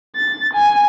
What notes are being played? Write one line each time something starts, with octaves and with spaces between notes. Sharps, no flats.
A6
G#5